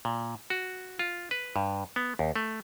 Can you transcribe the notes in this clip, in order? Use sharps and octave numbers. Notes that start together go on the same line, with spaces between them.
A#2
F#4
F4
B4
G2
B3
D#2
A3